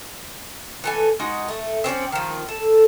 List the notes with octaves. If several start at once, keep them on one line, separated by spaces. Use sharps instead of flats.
E3 A4 G#5
G#3 D#4 F#4
A3
C4 C#4 C#5 D5
D#3 F3
A4